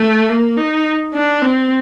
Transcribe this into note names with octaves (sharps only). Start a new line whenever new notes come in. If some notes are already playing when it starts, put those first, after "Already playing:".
Already playing: A3
A#3
D#4
D4
C4